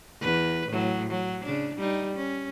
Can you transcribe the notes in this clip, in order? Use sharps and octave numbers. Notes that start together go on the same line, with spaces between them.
E2 B4
A2 F#3
F#3
C#3 D4
G3 D#4
C#4